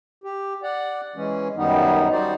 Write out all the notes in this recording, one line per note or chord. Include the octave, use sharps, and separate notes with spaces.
G4
D5 F#5
E3 G#3 C#4
F#2 D#3 G3 B3 D#4
G3 D#4 F#4 C5 D5